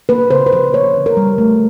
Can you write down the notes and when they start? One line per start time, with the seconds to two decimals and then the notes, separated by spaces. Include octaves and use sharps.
0.09 A#3 B4
0.31 C#3 C5
0.46 B4
0.53 F3 C5
0.73 A#3 C#5
0.94 D3
1.06 A#4
1.17 G3
1.38 A3